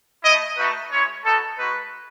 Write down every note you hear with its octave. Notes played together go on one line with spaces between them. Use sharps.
A3 E4 D#5
A3 D#4 F#4 B4
G#3 C#4 E4 C#5
B3 D#4 F#4 A4
G#3 D#4 F#4 B4